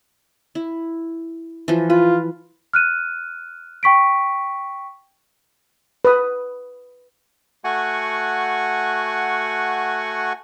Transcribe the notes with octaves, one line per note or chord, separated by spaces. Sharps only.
E4
E3 F3
F4 B4
F6 F#6 D#7
G5 C#6 B6 D7
B4 D#6
A3 F#4 F#5 G#5 C#6